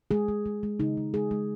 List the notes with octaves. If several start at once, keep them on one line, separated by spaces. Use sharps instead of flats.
G#3 G#4
G#3
G#3
G#3
C#3 D#4
G#3
G#3 G#4
G#3